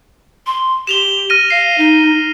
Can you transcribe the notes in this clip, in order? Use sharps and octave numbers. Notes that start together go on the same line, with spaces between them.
C6
G4 E7 F7 G7
F6 A#6 D#7
F5 C7
D#4